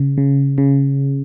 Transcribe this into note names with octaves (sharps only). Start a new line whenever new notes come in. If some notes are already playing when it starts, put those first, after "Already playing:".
Already playing: C#3
C#3
C#3